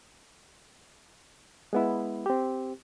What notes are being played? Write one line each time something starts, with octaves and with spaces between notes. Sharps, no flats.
G#3 B3 E4
C4 G4